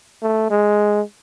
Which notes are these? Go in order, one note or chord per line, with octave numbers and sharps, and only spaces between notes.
A3
G#3